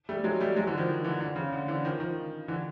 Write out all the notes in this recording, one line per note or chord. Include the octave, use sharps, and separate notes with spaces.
G3 A3
F#3 G#3
G3 A3
F#3 G#3
D3 E3
D#3 F3
D3 E3
D3
C#3
D3
D3 E3
D#3 F3
D#3 F3
D3 E3